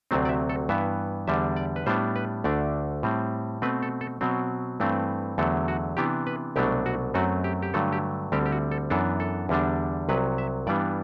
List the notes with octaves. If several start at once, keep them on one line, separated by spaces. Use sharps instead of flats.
D2 C3 F#3 A3 C4
D5
E5
A4
G2 E3 B3 E5
E2 D3 G3 D4 E5
D5
B4
A2 G3 B3 D4 C5
B4
D2 D3 A3 D4 D5
A2 G3 C4
B2 A3 C4 B4
A4
A4
B2 F#3 C4
G2 E3 A3 C4
E2 D3 F#3 A3 A4
F#4
C3 E3 B3 D4 G4
B4
C2 B2 F#3 A3 D4 G4
F#4
F#2 F#3 A3 C4 F#4
G4
G4
G2 D3 F#3 A3 A4
G4
D2 D3 G3 C4 G4
G4
F#4
A4
F#2 E3 B3 D4 A4
A4
E2 D3 G3 D4
C2 C3 F#3 B4
E5
G2 E3 G3 B3 D4 D5